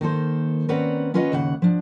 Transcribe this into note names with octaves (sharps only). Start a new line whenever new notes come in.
D#3 A#3 A4 C5
C4 C#4 B4 D5 F#5 A#5
C#4 F4 B4 C#5 D#5 F#5
D#2 C#3 F#5
F3 D4